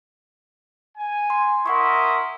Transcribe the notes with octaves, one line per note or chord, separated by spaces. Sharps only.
G#5
C6
E4 A#4 D#5 F#5 C6 C#6